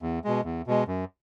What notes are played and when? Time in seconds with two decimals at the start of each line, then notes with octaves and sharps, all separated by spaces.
0.02 E2
0.24 B2 G#3
0.45 E2
0.67 B2 G#3
0.87 F#2